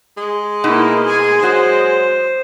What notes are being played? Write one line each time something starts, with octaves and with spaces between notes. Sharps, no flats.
G#3
B2 A#3 D#4 E4
G#4 G#5
F#3 F#4 C5